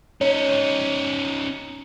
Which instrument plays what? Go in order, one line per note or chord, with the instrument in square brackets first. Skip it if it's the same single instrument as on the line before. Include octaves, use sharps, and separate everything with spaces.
[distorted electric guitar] C#4 D#4 [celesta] C#5